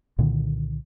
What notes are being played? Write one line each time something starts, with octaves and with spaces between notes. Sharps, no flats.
C2 A#2 D3 D#3